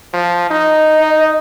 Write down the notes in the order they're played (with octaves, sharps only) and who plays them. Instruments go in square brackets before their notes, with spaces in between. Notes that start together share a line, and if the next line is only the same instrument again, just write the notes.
[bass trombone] F3
[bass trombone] D#4 [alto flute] D#5